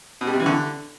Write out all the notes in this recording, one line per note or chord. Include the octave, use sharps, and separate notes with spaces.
B2
G3
C3
E3
D3